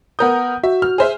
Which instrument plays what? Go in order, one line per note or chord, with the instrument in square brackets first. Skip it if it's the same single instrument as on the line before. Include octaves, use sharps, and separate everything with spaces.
[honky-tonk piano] B3 A#4 G6 [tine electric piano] F#5 D#6
[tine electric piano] F#4 [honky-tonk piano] E5
[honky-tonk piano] F6
G#4 C5 E5